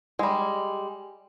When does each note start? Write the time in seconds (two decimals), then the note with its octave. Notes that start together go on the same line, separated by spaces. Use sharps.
0.19 G3 G#3